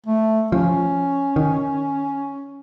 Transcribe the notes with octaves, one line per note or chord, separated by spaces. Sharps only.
A3
F3 C#4
D#3